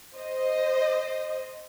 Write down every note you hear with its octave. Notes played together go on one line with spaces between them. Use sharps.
C5 D#5